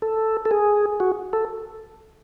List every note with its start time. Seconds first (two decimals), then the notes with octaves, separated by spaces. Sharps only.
0.02 A4
0.45 A4
0.51 G#4
1.00 F#4
1.33 A4